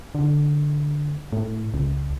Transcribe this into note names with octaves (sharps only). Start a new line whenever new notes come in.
D3
A2
C#2